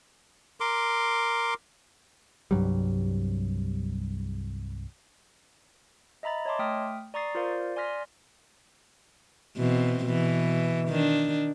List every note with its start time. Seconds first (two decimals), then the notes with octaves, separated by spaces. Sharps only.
0.60 A#4 C6 D6
2.51 C2 G2 F#3 G3
6.23 D#5 E5 A#5 B5 A6
6.45 C#5 D#5 A5 C6 D6
6.59 A3 G5 D#6 F6 B6
7.14 D5 A#5 C#6 D#6 A6 C7
7.35 F4 A#4 C5 D5 F5
7.76 D5 G#5 C6 F6 A#6 B6
9.57 B2 E3 C4
10.05 B2 E3
10.89 D#3 D4